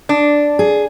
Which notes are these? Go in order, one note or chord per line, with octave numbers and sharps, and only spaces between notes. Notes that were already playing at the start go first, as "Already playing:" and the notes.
D4
G#4